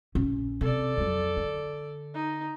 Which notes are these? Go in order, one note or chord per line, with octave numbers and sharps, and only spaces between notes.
A#1 C#4
C3 A4 D5
F2 F#3
D3
D#4